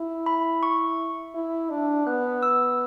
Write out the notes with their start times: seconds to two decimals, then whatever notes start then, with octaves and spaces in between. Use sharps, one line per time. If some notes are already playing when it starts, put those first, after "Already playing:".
Already playing: E4
0.26 B5
0.63 C#6
1.35 E4
1.70 D4
2.07 B3 F#6
2.43 E6